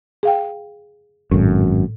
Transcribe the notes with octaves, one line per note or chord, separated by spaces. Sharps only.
G#4 F5 G5
G#1 F#2 A2